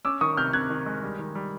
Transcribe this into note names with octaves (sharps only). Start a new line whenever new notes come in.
C#4 D6 E6
D#3 C#6 D#6
C3 F6 G6
C3 F#6 G#6
D#3
G#3
G3
D#3
G3